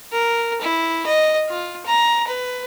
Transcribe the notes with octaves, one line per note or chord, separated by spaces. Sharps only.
A#4
E4
D#5
F4
A#5
B4